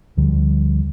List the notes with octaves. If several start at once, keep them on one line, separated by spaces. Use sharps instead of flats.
D2 D3 F3 G3